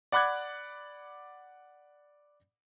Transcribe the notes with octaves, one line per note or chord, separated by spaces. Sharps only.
D5 F#5 B5 D6 F#6 G#6